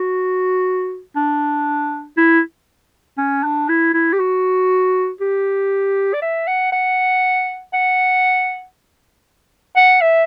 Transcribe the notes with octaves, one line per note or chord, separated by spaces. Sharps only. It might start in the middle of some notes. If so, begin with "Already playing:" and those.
Already playing: F#4
D4
E4
C#4
D4
E4
E4
G4
F#4
G4
D5
E5
F#5
F#5
F#5
F#5
E5